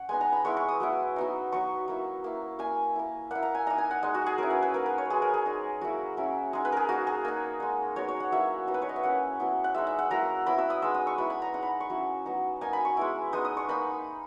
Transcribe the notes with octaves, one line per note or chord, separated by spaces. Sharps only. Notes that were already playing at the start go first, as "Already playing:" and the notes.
Already playing: C#4 F#5
G#3 B3 D#4 G#5
A#5
B5
G#3 B3 E4 C#6
C#6
D#6
F#3 B3 E4
F#3 B3 D#4
F#3 B3 D#4 C#6
F#3 A#3 E4
A#3 E4
A#3 E4 G#5
A#3 E4
A#3 E4 F#5
A#5
G#5
A#3 D#4 A#5
G#5
F#5
G#3 D#4 D#5
F#4
G#4
F#3 C#4 E4 A#4
B4
B4
A#3 D#4 A#4
B4
C#5
G#3 D#4 G#4
A#4
G#4
G#3 D#4
F#3 A#3 E4 F#4
F#3 C#4 E4
G#3 D#4 G#4
B4
G#4 A#4
A#3 D#4 F#4
G#4
A#3 D#4
G#3 D#4
F#3 B3 D#4 C#5
C#5
F#5
F#3 A#3 E4 E5
F#3 B3 D#4
B4
C#5
D#5
E5
A#3 C#4 E4 F#5
F#3 B3 E4
F#5
G#3 D#4 E5
E5
F#5
F#3 A#3 E4 A#5
F#3 B3 E4 B5
E6
D#6
G#3 D#4 E6
D#6
C#6
F#3 B3 E4 B5
B5
A#5
G#3 D#4 F#5
B5
C#6
F#3 C#4 E4
F#3 B3 D#4
A#3 D#4 G#5
B5
C#6
G#3 B3 E4
G#3 B3 D#4 D#6
D#6
C#6
A#3 D#4 B5